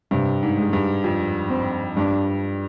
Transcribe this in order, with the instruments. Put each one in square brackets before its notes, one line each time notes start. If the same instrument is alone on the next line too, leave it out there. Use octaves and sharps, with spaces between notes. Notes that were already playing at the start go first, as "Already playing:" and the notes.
[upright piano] G2 [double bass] C3
[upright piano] G#2
[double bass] G#3
[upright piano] G2
F2
[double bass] C4
[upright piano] G2 [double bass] D4